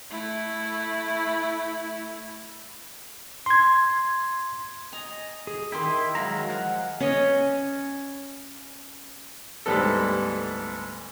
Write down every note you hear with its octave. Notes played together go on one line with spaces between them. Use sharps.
A3 E4
C6 G#6
D#5 G#5 A#5
G#4
D#3 E4 G4 G5 C6
F#3 G#3 E4 F5 A#5
F3 F#5
C#4 C#5 D#5
D2 G#2 G3 B3 A4